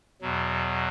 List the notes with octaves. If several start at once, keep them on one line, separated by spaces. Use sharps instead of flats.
E2 B2 F#3